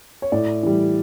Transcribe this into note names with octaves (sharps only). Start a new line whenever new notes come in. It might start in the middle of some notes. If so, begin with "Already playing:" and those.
C#5
A2 D5
E3 G3